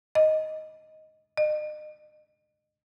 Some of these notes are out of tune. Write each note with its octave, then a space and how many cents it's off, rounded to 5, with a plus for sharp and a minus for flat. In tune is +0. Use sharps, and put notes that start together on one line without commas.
D#5 +5
D#5 -40